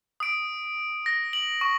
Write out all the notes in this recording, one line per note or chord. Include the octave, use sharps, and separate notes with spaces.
D#6 D7
A#6
F#7
C#6